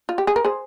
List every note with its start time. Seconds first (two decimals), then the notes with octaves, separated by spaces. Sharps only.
0.09 F4
0.18 G4
0.27 G#4
0.36 A#4
0.45 G#4 C5